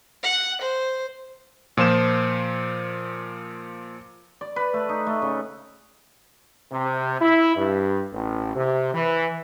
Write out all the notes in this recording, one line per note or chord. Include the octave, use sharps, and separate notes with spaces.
F#5
C5
A#2 F3 C5 E7
D5
B4
A3
D#4
A3
C#3
C3
E4
G2
A1
C3
E3